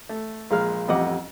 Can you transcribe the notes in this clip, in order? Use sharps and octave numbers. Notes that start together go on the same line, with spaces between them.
A3
A#1 G#3 F5 F6
A1 F2 G3 D#5 F#5 D6